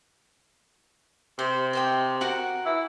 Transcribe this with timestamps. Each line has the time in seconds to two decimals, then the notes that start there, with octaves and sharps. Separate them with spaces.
1.39 C3 C5
1.73 C5 D#5 G5
2.21 F#4 A#4 F#5
2.66 E4